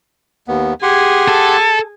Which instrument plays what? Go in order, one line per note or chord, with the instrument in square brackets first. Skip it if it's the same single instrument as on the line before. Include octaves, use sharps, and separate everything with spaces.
[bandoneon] D#2 B3
[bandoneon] G4 F#5 C6 [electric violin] G#4 G#5
[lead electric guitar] A4